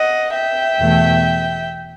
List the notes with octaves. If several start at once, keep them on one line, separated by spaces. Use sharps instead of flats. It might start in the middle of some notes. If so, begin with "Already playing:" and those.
Already playing: D#5 F#5
E5 G5
E2 B2 A3